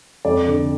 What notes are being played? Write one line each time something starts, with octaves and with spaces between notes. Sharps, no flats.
F2 D5
D3